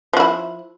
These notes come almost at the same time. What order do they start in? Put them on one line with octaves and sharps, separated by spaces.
F3 F#4 E4